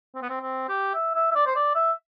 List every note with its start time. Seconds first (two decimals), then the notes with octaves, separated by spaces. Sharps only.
0.15 C4
0.22 B3
0.30 C4
0.41 C4
0.69 G4
0.95 E5
1.15 E5
1.31 E5
1.35 D5
1.47 C5
1.55 D5
1.75 E5